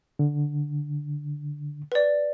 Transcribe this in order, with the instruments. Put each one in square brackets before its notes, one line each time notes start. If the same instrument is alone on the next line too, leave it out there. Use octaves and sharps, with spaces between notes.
[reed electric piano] D3
[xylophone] B4 D5